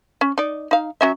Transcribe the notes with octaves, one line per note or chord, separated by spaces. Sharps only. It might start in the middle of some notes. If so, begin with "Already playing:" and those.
C#4
D#4 D5
D#4 F5
F#3 C#4 E5